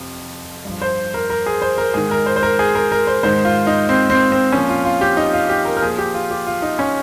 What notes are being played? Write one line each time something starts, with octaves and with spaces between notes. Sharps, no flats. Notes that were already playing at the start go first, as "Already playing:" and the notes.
Already playing: F2 C3 F3
G2 F3
C5
A#4
A#4
G#4
C5
A#4
G#2 D#3 G#4
A#4
C5
C5
A#4
G#4
A#4
A#4
C5
G#2 D#3 C5
F4
D#4
C4
C4
C4
A#2 F3 C#4
F4
F4
G4
D#4
F4
G4
A#4
A#4
A#2 F3 G#4
G4
F4
G4
F4
D#4
C#4